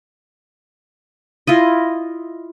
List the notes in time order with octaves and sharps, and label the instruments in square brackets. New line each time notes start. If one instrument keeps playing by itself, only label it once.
[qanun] E4 F4 D#5